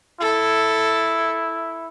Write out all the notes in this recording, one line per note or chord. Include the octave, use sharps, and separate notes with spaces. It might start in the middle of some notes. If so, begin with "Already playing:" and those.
E4 A4